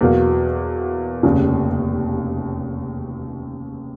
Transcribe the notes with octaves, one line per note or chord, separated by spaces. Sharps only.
E2 B2 F#3 A#3
F1 D#2 C#3